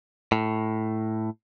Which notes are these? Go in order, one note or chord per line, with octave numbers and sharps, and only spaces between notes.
A2